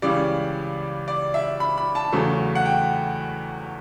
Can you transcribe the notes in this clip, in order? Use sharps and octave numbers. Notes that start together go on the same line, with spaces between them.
C#2 C#3 E3 G3 D5
D5
E5
B5
B5
A5
E2 C#3 F#3 A3
F#5
G5